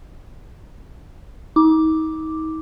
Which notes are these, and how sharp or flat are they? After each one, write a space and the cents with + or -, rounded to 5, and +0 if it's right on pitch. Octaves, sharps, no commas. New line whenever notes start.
D#4 +35 D6 +0